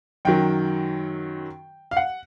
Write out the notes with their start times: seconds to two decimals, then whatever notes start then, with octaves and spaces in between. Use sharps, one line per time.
0.25 F#2 D#3 F#3 G5
1.91 F5
1.97 F#5